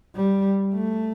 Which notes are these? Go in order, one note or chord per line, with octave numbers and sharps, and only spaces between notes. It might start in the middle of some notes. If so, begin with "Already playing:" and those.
G3
A3